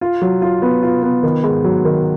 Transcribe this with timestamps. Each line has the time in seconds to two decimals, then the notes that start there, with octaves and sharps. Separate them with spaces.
0.01 F4
0.22 F#3
0.42 F4
0.62 B3
0.83 F4
1.03 B3
1.23 D#3
1.44 G#2
1.64 F#3
1.85 D#3